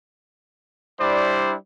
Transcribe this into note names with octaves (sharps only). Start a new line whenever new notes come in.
G3 D4 E4 C5 D5